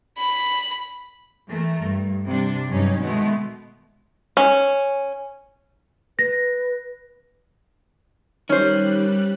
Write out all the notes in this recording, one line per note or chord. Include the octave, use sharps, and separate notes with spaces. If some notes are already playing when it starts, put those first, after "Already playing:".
B5
E3 A3 A#4
G2
C3 G3 D4
G2 F#3 C#4 D#4
B2 D#3 G#3 A3 B3
C#4
B4 A#6
D#3 G3 C#4 C5 F#6